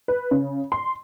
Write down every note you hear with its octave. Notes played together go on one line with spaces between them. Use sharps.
B4
C#3
C6